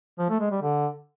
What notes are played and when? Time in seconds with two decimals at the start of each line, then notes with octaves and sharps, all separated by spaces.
0.18 F3
0.29 A3
0.40 G#3
0.51 G3
0.62 D3